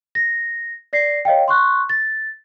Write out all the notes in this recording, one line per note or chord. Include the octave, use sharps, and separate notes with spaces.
A#6
D5 A#6 C7
C#5 D#5 F5 G5
C6 C#6 F#6
A6